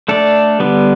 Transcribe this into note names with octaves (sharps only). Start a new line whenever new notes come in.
A3 D4 A4 D5
D3 G3 B3